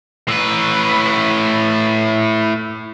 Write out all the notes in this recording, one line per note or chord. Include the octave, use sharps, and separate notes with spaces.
A2 B4